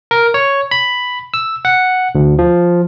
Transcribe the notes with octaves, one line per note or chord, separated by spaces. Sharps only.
A#4
C#5
B5
E6
F#5
D2
F3